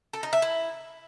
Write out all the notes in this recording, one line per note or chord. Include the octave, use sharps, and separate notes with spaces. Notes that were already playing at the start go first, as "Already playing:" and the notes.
A4
D#4
E5
E4